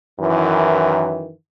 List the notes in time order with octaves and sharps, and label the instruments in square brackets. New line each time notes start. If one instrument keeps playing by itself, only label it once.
[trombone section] F#2 D#3 E3